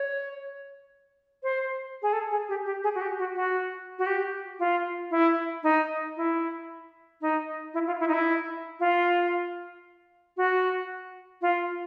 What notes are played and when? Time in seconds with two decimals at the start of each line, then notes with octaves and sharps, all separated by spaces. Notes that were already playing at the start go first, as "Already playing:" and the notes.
Already playing: C#5
1.43 C5
2.02 G#4
2.13 A4
2.31 G#4
2.49 G4
2.66 G4
2.83 G#4
2.95 F#4
3.02 G4
3.19 F#4
3.35 F#4
3.99 F#4
4.06 G4
4.59 F4
5.11 E4
5.63 D#4
6.17 E4
7.22 D#4
7.74 E4
7.87 F4
8.00 E4
8.08 D#4
8.13 E4
8.80 F4
10.37 F#4
11.42 F4